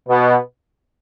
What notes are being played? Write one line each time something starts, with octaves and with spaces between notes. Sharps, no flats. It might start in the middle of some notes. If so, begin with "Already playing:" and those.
B2 B3